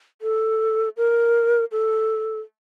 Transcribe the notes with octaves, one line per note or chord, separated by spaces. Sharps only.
A4
A#4
A4